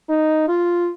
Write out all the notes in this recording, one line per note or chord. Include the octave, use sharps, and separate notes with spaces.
D#4
F4